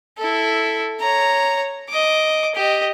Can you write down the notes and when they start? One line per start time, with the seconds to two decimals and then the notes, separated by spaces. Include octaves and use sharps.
0.18 E4 A4
1.00 C#5 A#5
1.89 D#5 D6
2.55 G4 D#5